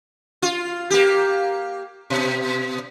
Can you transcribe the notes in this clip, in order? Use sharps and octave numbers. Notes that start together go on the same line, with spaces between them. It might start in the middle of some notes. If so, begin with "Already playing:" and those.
F4
A#3 G4
B2